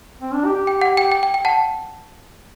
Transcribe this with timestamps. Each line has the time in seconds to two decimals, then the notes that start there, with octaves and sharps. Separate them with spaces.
0.22 C4
0.34 D4
0.45 G4
0.56 G4
0.67 G5
0.81 F#5
0.97 G5
1.12 G5
1.23 G5
1.34 G5
1.45 F#5 A5